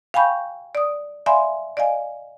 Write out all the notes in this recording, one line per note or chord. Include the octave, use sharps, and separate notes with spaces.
F5 G5 G#5 B5 C#6 G6
D5 D#6
D5 E5 F5 G#5 B5 C6
D5 D#5 F5 G#5